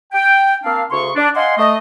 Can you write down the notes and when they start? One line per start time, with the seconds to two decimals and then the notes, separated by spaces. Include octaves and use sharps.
0.13 G5
0.64 A#3 C4 D4 F5
0.91 D2 C#3 C6 C#6
1.16 D4
1.36 D#5 F5 F#5 G#5 C6
1.58 A3 D#5